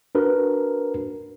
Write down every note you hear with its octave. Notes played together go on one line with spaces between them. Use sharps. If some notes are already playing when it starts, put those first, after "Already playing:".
D4 F#4 A#4 B4